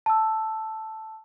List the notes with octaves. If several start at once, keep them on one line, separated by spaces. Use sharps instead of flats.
A5 E6